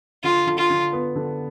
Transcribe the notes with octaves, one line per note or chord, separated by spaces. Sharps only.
D3 F4
D3
F4
D3
B3
D3